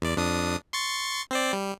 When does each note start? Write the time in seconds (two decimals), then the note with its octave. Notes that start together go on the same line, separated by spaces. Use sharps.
0.02 E2 D5
0.17 F2 D4 D#6
0.73 C6 C#6 A6
1.31 C4 C5 D5
1.53 G3